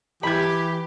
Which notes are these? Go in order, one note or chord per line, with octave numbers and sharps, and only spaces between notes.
E3 G4 B5 G#6